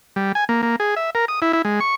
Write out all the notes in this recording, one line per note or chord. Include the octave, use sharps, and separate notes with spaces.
G3
G#5
A#3
A#3
G#4
E5
A#4
D#6
E4
E4
G#3
C#6